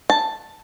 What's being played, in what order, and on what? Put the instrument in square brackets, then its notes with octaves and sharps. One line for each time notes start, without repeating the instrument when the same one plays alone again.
[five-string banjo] A5